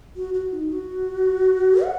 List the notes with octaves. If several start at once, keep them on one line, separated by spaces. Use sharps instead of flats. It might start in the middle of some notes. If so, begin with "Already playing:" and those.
F#4
F#4
D#4
F#4
F#5